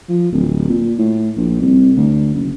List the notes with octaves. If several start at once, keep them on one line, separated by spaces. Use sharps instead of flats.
F3
D1
A#2
A2
A#1
C2
D2
F#1